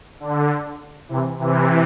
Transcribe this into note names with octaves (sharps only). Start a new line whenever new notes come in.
D3
C3 E3
C3 E3